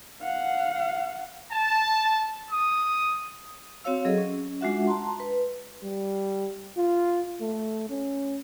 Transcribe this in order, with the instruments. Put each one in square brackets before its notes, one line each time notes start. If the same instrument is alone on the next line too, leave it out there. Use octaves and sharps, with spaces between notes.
[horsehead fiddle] F5 F#5
[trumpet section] A5
[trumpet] D#6
[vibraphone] C4 F#4 C#5 F5 E6
F#3 G#4 A4 D#5
C#4
G#3 D4 F4 F#4 E5 F#5
A5 A#5 C6
B4
[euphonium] G3
F4
A3
C#4